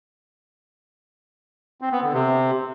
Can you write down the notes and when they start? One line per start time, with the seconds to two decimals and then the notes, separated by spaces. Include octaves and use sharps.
1.81 C4
1.92 B3
2.03 D3
2.13 C3